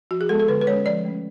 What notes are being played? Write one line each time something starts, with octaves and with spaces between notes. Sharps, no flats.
F3 F#4
G#4
G#3 B3 A4
A4
D3 B4
B4
G#3 C#4 C#5
F3 D5
A3 C#4